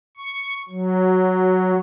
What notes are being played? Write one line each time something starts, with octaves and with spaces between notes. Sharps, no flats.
C#6
F#3